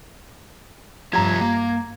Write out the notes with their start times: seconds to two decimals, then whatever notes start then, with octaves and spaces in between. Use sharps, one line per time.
1.13 G2 F3 F4 G4 A#5 G#6
1.41 A#3